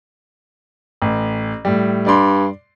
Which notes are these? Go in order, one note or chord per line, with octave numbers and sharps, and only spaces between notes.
A1
A2 G3
G2 D5 C6